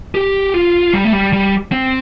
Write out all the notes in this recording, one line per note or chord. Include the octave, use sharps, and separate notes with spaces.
G4
F4
G3
A3
G3
G3
C4